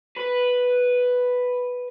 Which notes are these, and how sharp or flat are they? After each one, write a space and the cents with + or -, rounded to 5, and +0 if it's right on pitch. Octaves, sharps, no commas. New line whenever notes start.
B4 +0